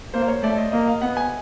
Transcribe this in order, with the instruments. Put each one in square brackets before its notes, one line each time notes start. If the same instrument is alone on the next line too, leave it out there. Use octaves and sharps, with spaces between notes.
[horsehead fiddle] A#3 [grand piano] C5
[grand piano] C#5
[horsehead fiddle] A3 [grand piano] D5
[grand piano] D#5
[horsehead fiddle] A#3 [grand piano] D#5
[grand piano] F5
[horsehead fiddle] B3 [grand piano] F#5
[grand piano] G#5